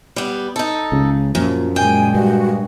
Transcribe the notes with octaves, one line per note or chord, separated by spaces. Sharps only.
G3 B3
D#4 A4
C#2 C#3
F#2 A#2 F3
A#2 G#3 G5 G#5
G2 F#4